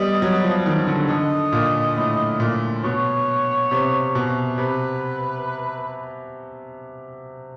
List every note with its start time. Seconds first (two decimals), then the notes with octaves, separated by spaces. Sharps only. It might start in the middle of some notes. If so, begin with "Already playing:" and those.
Already playing: G3 B3 D#5
0.22 F#3
0.44 F3
0.66 D#3
0.87 D3
1.08 D3 D#5
1.52 A#2
1.97 A2
2.40 A#2
2.84 B2 C#5
3.71 C3
4.15 B2
4.58 C3 B4